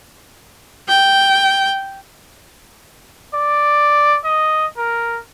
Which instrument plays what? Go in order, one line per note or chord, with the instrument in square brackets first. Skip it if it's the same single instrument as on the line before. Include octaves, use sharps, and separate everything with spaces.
[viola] G5
[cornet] D5
D#5
A#4